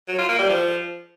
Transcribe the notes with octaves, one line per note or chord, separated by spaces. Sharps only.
F#3
F4
A#3
G3
F3